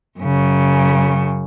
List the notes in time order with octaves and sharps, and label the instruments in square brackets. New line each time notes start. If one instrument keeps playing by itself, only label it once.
[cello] F#2 C#3